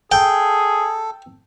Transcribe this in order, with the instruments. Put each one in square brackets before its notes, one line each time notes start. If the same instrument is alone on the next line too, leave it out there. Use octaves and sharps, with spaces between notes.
[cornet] G#4 [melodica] A4 [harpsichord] G5